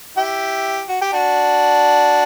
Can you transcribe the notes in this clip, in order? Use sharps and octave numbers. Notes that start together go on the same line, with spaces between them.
E4 G4
F#4
G4
D4 F#4